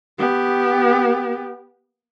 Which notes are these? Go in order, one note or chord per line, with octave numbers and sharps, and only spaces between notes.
B3 G4